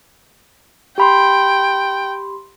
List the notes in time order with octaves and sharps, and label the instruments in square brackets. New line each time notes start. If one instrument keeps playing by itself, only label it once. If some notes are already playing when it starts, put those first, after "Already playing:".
[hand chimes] G4 B5 C6 [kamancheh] G5